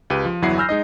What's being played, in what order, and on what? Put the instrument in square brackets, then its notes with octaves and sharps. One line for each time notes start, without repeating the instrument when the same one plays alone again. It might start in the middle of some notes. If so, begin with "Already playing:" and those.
[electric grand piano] C#2 G4 B4 D#7
F3
G1 E2 F#3 E4 F#5 C7
G#5 B5 E6 F6 G6 A#6
G#3 D#4 D#5